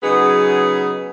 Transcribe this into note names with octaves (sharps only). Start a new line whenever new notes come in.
C#3 F#3 B3 D#4 G#4